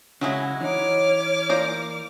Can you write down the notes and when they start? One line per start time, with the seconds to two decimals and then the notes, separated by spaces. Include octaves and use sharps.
0.21 C#3 F#3 G#3 E4
0.61 E3 D#4 C#5 D6 F6
1.49 A#3 C5 D5